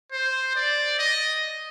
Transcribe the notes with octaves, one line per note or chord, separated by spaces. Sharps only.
C5
D5
D#5